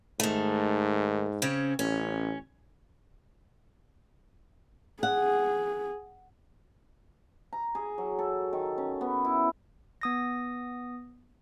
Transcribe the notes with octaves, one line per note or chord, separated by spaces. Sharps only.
G#2 D#3 A3
C#3 C4 C#4
A1 C#4
G#4 F#5
A#5
G#4
F#3
A4
D#3
C#4
B3
E4
B3 D#6 A#6